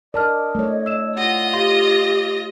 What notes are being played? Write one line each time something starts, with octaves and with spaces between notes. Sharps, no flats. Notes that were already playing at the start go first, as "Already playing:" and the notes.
A#4 D5 D#5 A5 F6
A3 C#5
E6 E7
F4 D#5 F#5
G4 F5 C6